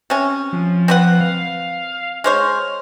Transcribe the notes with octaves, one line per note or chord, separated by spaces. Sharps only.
C3 C#4
F3
C4 B4 F#5
F5
G#3 C5 C#5 F6